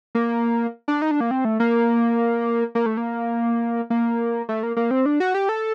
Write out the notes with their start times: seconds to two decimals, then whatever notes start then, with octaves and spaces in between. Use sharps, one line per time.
0.15 A#3
0.88 D4
1.02 D#4
1.11 D4
1.20 A#3
1.31 C4
1.45 A3
1.60 A#3
2.75 A#3
2.86 A3
2.97 A#3
3.90 A#3
4.49 A3
4.63 A#3
4.76 A#3
4.91 C4
5.06 D4
5.20 F#4
5.34 G4
5.49 A4